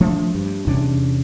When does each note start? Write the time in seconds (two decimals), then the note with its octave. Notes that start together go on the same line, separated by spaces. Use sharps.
0.01 F3 A3 D4
0.35 G2
0.67 E2 C3 C#4 D4